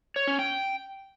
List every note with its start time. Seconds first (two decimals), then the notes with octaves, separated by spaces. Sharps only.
0.16 C#5
0.27 C#4
0.39 G5